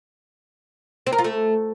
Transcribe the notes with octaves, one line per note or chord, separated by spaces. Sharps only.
C4
A#4
F4
A3